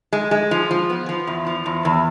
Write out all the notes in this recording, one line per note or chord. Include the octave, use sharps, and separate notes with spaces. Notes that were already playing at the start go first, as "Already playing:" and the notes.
G#3
G#3
F3
F3
B3
F3
E2
F3
E2
E2